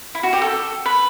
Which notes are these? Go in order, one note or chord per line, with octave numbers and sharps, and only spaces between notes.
E4
F#4
G4
A4
B4